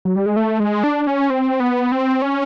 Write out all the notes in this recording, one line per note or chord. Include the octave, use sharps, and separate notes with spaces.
F#3
G3
G#3
A3
G#3
D4
C#4
C4
B3
C4
C#4